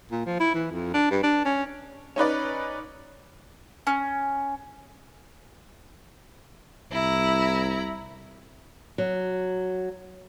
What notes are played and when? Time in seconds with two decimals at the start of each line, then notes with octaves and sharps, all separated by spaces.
0.11 A#2
0.26 F3
0.40 E4
0.55 E3
0.71 F2
0.94 D4
1.11 G2
1.23 D4
1.45 C#4
2.16 C#4 D#4 B4 D5
3.87 C#4
6.92 C2 E4 A#5
8.98 F#3